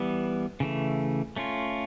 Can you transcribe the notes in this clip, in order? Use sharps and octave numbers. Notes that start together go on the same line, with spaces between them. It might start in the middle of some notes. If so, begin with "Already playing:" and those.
Already playing: E3 G3 B3
C#3 E3 A3
A3 C#4 F4